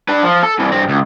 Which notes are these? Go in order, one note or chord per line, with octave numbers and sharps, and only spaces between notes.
D4 B4
F3
A4
C2 E3
G2 C4
C#2